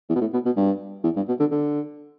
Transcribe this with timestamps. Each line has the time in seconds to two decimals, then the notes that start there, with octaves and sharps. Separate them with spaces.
0.09 E2
0.15 B2
0.21 A2
0.33 B2
0.46 B2
0.57 G2
1.04 E2
1.16 G2
1.28 B2
1.40 D3
1.52 D3